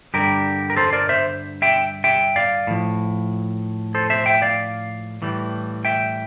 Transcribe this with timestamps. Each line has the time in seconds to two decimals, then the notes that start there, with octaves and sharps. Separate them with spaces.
0.14 G2 D3 G3 G4 A#4
0.70 A#4
0.77 A4 C5
0.93 A#4 D5
1.09 C5 E5
1.62 E5 G5
2.04 E5 G5
2.36 D5 F5
2.67 A2 F3
3.95 A4 C5
4.10 C5 E5
4.26 E5 G5
4.42 D5 F5
5.22 A2 E3 G3
5.85 E5 G5